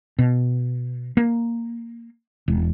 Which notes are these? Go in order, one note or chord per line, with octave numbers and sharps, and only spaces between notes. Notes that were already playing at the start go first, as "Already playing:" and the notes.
B2
A#3
E1